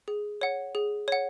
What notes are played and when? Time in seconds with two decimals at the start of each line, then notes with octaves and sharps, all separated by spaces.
0.08 G#4
0.41 C#5 F#5
0.75 G#4
1.08 C#5 F#5